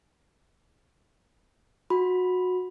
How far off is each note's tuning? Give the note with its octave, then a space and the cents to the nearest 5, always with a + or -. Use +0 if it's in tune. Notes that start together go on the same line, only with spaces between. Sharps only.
F#4 -20 B5 +0